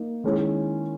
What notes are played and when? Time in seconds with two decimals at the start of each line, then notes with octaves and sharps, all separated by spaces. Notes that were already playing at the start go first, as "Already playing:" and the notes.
Already playing: A#3 D#4
0.24 D#3 G#3 C#4 E4